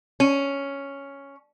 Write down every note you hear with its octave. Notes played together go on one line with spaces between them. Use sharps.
C#4